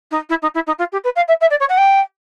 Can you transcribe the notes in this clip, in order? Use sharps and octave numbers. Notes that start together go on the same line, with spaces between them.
D#4
E4
D#4
E4
D#4
F4
G4
B4
F5
E5
E5
D5
C#5
F#5
G5